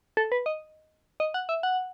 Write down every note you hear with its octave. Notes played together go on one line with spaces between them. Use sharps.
A4
B4
D#5
D#5
F#5
E5
F#5